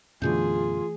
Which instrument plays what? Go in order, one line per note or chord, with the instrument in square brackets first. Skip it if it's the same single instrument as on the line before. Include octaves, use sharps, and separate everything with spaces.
[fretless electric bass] F#2 B2 D3 [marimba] E3 A3 G6 [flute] F4 [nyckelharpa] G#4